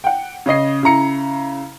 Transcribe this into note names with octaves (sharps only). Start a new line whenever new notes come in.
F#5 G5
C#3 C#4 D#5 C7
C#3 E4 A#5 C#7